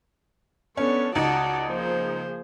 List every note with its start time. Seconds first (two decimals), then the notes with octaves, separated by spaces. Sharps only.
0.77 B3 C#4 D4 A4 C#5
1.15 C#2 D#4 F#4 D5 F#5 A5
1.68 F3 A#3 G#4 C5